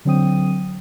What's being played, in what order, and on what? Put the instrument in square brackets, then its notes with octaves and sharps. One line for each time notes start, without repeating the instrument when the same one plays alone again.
[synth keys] D3 F#3 C4 G5 D#6 D#7